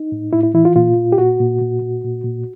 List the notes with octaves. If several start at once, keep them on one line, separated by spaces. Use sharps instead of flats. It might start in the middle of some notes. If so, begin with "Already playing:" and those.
Already playing: D#4
A2
A2 E4
E4
E3 E4
F4
A#2 F4
A#2
G4
A#2 F#4
A#2
A#2
A#2
A#2
A#2